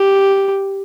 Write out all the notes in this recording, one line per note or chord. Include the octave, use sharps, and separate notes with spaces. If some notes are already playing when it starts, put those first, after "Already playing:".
Already playing: G4